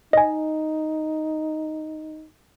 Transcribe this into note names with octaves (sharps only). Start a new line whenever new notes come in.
D#4 D#5 G#5